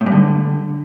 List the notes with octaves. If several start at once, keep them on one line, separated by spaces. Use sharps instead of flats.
A2
G2
D3